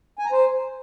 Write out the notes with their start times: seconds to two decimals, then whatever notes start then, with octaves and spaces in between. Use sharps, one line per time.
0.19 G#5
0.25 A#5
0.32 C5